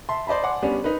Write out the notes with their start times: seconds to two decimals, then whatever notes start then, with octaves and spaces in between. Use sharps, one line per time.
0.09 E5 A5 C6
0.27 C5 D5 D#5 A5 B5
0.44 D5 F#5 G#5 C6 D6
0.62 G3 B3 C#4 D4
0.84 D#4 A#4 B4